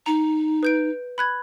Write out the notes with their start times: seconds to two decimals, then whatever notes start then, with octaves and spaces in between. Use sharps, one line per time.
0.06 D#4 A#5
0.63 B4 G6 D7
1.18 B5 F#6 G#6